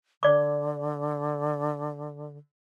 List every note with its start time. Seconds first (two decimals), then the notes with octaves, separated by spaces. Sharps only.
0.23 D3 D5 D6